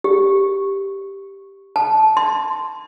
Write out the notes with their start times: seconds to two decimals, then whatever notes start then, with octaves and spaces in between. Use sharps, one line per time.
0.04 G4
1.76 A5
2.17 C6